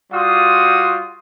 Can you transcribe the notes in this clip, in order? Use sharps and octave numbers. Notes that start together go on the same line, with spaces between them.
G3 F4 F#4 C6 D#6